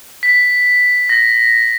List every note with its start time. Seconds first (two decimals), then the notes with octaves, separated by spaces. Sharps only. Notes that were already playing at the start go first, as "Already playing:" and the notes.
0.23 B6
1.09 A#6